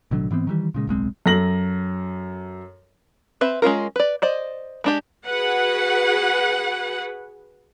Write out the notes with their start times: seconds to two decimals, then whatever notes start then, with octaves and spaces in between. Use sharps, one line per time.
0.11 A1 B2 D3 F#3
0.31 G#2 E3 B3 C4
0.47 D#3 E3 G3
0.74 A#2 C#3 G#3
0.87 D1 B1 G#3 C4
1.26 F#2 A4 A#6 F#7
3.41 C4 B4 E5
3.62 G#3 C#4 F4 A#4
3.96 B4 D5
4.22 C5 D5 D#5
4.84 G#3 D4 G4
5.26 F#4 G#4 B4 F#5